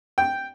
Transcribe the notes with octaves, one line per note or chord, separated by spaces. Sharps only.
G5